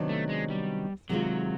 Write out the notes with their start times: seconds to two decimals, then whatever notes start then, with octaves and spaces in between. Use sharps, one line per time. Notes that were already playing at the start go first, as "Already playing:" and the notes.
Already playing: C3 D#3 F#3 B3 D4
0.09 A3
0.29 G#3
0.50 G3
1.09 C3 D#3 F#3 G#3 C4 F4